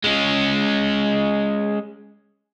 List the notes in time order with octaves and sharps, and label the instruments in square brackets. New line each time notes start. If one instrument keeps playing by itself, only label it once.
[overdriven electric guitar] G#3 C#4